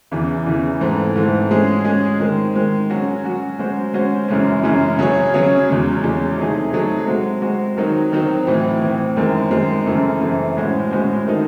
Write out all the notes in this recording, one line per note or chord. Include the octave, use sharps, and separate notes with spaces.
E2 C#3 E3
E2 C#3 E3
G#2 E3 A3 C4
G#2 E3 A3 C4
G#3 C#4 G#4
G#3 C#4 G#4
D#3 G#3 C4
D#3 G#3 C4
F#3 C#4 F#4
F#3 C#4 F#4
G#3 C#4 F#4 C5
G#3 C#4 F#4 C5
F#2 C#3 E3 G#3 C#4
F#2 C#3 E3 G#3 C#4
C#3 F#3 C#4 G#4 C#5
C#3 F#3 C#4 G#4 C#5
E2 C#3 G#3 C#4
E2 C#3 G#3 C#4
C3 F#3 A3 D#4 G#4
C3 F#3 A3 D#4 G#4
G#3 C4 F#4
G#3 C4 F#4
D#3 F#3 C4 D#4
D#3 F#3 C4 D#4
A2 E3 C4
A2 E3 C4
F#2 D#3 G#3 C4
F#2 D#3 G#3 C4
F#2 C#3 E3 A3 C4
F#2 C#3 E3 A3 C4
A2 G#3 C#4 F#4 C5
A2 G#3 C#4 F#4 C5
D#3 A3 C4 D#4